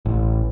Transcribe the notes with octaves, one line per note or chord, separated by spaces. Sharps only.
A1